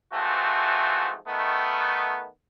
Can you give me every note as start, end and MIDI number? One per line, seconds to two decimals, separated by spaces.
0.12 1.15 44
0.12 1.15 52
0.12 1.15 53
0.12 1.15 57
0.12 1.15 60
0.12 1.15 66
1.27 2.27 51
1.27 2.27 57
1.27 2.27 59